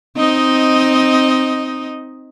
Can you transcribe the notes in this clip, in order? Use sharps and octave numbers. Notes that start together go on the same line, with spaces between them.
C4 D#4 D#5